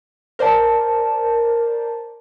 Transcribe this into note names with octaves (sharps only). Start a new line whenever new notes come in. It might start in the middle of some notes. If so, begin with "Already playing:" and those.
A#4 C5 D5 A5